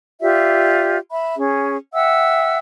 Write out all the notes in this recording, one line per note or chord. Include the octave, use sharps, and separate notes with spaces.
F4 G4 D5 E5
E5 B5
C#4 G#4
E5 F#5 G5 E6